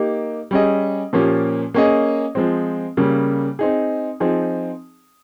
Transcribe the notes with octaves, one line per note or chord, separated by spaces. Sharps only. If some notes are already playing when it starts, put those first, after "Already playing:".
Already playing: A#3 D#4 G4
G3 C#4 G#4 D#5
A#2 F3 A#3 C#4 G4
A#3 C#4 G#4 D#5
F3 G#3 C4
C#3 G3 A#3 C#4
C4 D#4 G#4
F3 C4 D#4 G#4